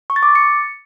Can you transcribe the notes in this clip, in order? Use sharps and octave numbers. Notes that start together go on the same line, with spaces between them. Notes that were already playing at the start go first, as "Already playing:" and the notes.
C#6
A6
D6
A6
C#7